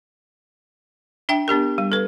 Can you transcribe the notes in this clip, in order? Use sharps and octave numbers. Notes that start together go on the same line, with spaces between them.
D4 E5 G5
B3 D4 G4 A#4
G3
A4 B4